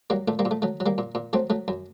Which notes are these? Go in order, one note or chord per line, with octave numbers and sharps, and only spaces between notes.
F#3 G3 A#3
A#2 A3
G3 A#3
A#2
A3
F#3 A3
F#3
G3 A#3
A#2
A#2
F#3 A3 C4
F#3 A3
F#2